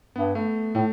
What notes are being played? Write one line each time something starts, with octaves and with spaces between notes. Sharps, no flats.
G2 B3
A3
A2 A3